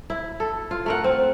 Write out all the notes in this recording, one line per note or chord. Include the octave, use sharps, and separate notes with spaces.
E4
A4
F4
A3 A#4 F#5
C4